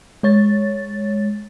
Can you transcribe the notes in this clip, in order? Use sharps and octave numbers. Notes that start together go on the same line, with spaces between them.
G#3 C#5 A6